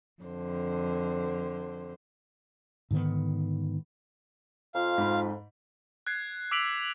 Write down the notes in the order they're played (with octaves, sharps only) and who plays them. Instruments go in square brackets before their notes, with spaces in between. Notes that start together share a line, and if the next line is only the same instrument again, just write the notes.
[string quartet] F2 D3 C5
[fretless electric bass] G#2 D3 D#3 B3
[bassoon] F2 [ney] F4 [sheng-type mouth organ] F5
[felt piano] G#2 B5
[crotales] F#6 G#6 C7
D6 E6 B6 D7 F7 F#7